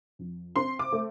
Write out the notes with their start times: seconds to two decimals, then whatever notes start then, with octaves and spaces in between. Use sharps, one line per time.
0.19 F2
0.56 C4 C6
0.79 D6
0.92 A3